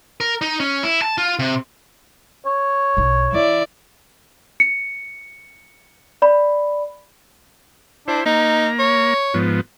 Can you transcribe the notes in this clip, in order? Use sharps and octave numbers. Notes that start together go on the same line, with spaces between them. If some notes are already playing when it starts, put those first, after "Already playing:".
A#4
D#4
C#4
E4
A5
F4
C3
C#5
B1 E4
D3 E3 E4 D5
C#7
D5 B5
D4 E4 C5
A#3 D#4 A#5
C#5
G#2 F3 B3